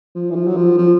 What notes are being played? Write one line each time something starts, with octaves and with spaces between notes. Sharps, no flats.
F3
E3
F3
F#3
F3
F3